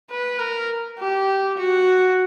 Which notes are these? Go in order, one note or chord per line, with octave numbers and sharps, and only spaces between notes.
B4
A#4
G4
F#4